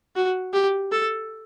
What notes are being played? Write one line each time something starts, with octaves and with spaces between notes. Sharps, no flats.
F#4
G4
A4